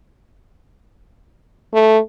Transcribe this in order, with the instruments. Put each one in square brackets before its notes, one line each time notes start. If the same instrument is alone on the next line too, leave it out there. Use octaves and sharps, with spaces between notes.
[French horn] A3